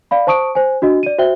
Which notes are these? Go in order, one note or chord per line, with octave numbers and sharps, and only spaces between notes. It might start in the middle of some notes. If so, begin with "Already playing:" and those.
D5 F5 B5
C5 A5 C#6 D#6 D7
C5 G#5
D4 F#4 D#5
D5 D#7
F#4 C5 E5 G5 G7